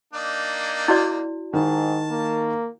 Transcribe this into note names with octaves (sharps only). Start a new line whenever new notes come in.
A#3 D4 D#4
E4 F#4 D5
G#2 D#3 A5
A#3